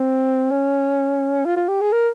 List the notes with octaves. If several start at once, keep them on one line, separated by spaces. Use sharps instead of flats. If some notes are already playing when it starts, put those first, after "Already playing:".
Already playing: C4
C#4
F4
F4
G4
G#4
A#4